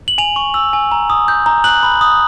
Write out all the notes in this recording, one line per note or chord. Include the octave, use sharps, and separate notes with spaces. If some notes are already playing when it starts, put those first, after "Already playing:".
F#7
G#5 F7
C#6
E6
G#5
A#5
D#6
G6
A#5
F#6 F#7
B5
D#6